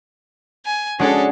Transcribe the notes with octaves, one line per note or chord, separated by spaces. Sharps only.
G#5
G#3 C#4 D4 F#4 G#4 A4